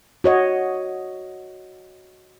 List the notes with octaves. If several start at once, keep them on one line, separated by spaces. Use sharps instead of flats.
F#4 C#5 D#5